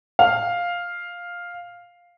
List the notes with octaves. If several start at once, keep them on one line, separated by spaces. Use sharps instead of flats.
F5